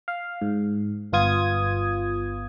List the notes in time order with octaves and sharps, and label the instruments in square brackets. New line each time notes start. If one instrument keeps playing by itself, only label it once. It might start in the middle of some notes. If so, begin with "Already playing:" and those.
[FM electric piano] F5
G#2
G1 B3 F4 D#6 G#6